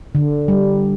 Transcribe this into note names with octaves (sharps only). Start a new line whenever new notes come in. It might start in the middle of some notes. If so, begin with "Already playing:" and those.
D3
G3